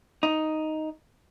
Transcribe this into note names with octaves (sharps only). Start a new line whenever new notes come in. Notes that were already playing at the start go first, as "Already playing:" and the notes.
D#4